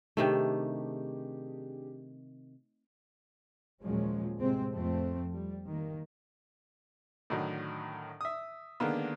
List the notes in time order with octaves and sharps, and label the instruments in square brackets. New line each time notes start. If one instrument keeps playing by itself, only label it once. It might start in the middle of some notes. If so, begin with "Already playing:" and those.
[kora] C3 D#3 A3 [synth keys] D4 G4 G#4
[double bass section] D#2 A#2 F3 F#3 G#3 C#4
A2 C3 G#3 C4
F2 F3 A3 C4
G3
D#3 A#3
[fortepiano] A2 D3 D#3 F#3 D#4
E5 D#6
D3 D#3 G#3 A#3 B3